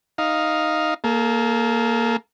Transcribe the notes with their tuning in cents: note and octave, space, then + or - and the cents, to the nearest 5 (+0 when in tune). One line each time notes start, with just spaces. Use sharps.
D#4 +0 F5 +0
A#3 +0 A4 -35